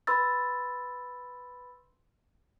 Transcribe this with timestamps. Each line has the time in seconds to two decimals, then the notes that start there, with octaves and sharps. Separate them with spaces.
0.07 B4 B5 C6 E6 A6